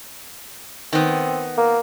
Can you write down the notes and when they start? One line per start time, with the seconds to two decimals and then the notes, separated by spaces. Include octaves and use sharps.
0.93 D#3 B3 C4
1.58 A#3